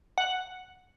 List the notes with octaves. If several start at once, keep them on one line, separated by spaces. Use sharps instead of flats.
F#5